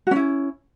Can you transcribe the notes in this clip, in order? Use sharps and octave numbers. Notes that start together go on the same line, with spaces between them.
C#4 E4 F#4